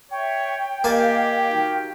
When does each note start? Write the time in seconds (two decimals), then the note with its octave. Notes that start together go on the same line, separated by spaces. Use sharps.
0.11 C#5 E5 G5 C#6
0.84 A#3 G4 A#4 D#5 F5 G#5 A5
1.47 D#4 F#4 A#4